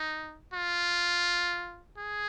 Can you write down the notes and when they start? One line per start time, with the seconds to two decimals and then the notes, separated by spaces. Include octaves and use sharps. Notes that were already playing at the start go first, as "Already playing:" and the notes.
Already playing: D#4
0.54 F4
1.98 G#4